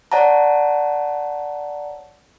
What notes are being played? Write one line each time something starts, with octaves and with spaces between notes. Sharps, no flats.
C#5 D5 F#5 A5 A#5